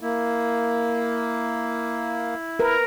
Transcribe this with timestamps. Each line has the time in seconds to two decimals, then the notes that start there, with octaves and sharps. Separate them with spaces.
0.01 A#3 E4
2.59 A#4 B4